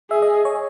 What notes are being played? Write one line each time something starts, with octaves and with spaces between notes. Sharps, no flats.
G#4 E5
D#5
C#5